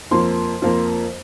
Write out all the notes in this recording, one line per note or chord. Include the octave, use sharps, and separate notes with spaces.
F2 F3 A#3 C6
F2 F3 A#3